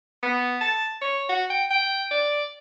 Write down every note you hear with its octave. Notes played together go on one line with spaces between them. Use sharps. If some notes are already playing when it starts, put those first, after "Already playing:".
B3
A5
C#5
F#4
G5
G5
D5